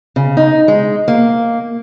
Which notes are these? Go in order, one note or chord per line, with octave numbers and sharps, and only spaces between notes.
C#3
D#4
G#3
A#3